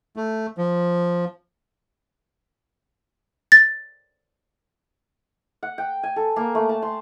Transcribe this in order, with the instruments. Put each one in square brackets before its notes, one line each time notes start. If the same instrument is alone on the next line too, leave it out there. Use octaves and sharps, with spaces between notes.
[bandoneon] A3
F3
[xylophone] A6
[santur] F#5
G5
G#5
A4
A#3
A3
A5
C6